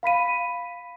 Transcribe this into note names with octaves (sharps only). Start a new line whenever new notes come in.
F5 B5 B6 D#7